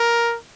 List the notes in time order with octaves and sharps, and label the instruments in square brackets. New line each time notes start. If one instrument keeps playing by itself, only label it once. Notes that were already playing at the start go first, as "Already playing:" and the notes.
Already playing: [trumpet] A#4